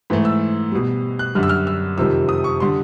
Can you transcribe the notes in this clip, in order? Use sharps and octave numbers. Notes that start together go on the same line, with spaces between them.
G#2 E3 A3
E6
B2 G3
F#6
F#2 D3 G3 F6
E6
F6
E6
F2 C3 D#3 G3 E6
D#6
C#6
D3 G3 C6